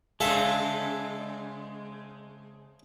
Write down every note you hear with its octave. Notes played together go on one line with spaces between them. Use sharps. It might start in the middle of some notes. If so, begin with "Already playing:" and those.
C#3 G#3 C4 G#4 A4 E5 F5